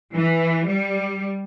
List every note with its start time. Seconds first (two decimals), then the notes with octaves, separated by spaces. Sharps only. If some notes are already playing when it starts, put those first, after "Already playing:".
0.14 E3
0.67 G3